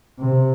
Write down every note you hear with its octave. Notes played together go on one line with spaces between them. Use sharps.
C3